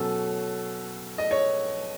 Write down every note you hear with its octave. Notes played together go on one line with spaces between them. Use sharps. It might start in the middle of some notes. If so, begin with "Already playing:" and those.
Already playing: B2 F#3 C#4 A4
D#5
C#5